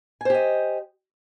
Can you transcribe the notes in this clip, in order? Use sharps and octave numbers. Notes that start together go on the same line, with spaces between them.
G4 C5 D#5 G#5